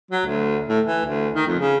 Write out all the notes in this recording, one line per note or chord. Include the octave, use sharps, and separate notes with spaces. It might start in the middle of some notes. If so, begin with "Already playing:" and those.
F#3
D2
A2
E3
D2
D#3
F2
C#3